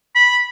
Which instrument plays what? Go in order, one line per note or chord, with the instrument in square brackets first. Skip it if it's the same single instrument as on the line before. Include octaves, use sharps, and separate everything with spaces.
[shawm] B5